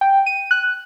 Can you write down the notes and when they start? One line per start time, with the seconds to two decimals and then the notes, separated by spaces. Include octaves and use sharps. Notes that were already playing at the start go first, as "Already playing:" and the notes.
0.01 G5
0.26 D#7
0.51 F#6